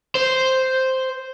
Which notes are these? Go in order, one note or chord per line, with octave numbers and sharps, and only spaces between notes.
C5